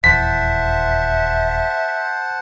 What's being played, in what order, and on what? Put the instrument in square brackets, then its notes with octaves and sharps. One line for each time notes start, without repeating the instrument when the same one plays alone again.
[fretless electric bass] D#1 E2 E3 [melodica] C5 F#5 A5 [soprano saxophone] E5 [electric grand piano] B6